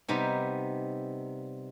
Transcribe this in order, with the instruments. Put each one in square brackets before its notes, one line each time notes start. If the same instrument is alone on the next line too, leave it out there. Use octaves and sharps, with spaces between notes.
[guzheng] C3 G3 B3 D#4